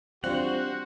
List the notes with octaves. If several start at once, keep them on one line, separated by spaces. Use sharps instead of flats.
G3 C4 D4 F4 F#4 C5 F#5